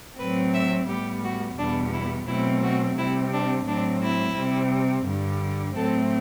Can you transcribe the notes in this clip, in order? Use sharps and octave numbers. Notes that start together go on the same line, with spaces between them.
A2 F#3 C4 B4
E5
A2 G3 B3 G4
F#4
E2 B2 G3 B3 D4
E4
B2 F#3 A3 C4 E4
F#4
C3 G3 C4 E4
D4
A2 F#3 C4 D4
E4
C3 G3 C4
G2 D3 G3
A2 F#3 A3 C4 A4